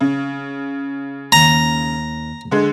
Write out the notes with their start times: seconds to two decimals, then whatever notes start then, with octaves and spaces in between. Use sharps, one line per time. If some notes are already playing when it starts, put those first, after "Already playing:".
0.01 C#3
1.32 D#2 A#5
2.51 D3 G#3